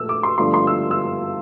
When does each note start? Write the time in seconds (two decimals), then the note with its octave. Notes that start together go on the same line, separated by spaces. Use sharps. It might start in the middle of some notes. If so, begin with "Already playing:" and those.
Already playing: A#1 A#2 A3 E6
0.09 D6
0.23 C6
0.38 G1 G2 F3 A3 C6
0.54 C6
0.67 E6
0.91 E6